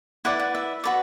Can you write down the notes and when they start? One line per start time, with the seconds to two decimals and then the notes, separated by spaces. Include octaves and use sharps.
0.25 E4 B4 D5 F#5
0.39 F#5
0.55 E5
0.84 F#4 B4 D5